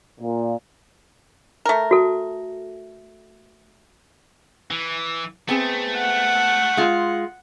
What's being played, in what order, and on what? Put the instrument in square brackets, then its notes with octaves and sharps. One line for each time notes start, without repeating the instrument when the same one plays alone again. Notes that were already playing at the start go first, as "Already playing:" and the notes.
[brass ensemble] A#2
[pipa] A3 A#4
[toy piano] F#4 A4 A5
[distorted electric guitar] E3
[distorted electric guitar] A3 [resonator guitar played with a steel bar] B3 C4 G#4
[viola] F#5
[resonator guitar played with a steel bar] G#3 F4